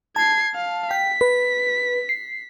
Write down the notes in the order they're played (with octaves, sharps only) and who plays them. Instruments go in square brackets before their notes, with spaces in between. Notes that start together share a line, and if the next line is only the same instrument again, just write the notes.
[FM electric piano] A5 [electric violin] G#6 C7
[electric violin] F5
[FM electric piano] G5 [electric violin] B6
[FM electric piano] B4
C7